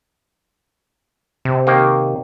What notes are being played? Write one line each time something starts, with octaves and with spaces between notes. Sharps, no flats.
C3
D#3 A#3